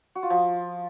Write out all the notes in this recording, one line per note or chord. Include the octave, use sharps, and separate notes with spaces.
F#4
F4
F3